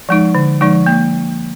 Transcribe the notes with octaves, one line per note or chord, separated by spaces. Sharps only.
F3 G#3 D#4
D3
F3 G#3 D#4
A#3